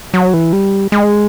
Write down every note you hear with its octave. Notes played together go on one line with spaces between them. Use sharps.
F#3
E3
G3
G#3